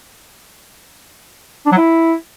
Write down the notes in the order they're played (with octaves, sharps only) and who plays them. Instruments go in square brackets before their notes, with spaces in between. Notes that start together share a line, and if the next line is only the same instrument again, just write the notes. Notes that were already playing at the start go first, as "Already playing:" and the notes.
[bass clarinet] D4
F#3
E4